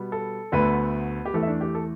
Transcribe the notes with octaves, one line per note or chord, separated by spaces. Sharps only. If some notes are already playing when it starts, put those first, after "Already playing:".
Already playing: B2 G3 B3
A4
D2 D3 A3 B3 B4
G4
E2 E3 A3 A4
E5
D4 D5
G4
A4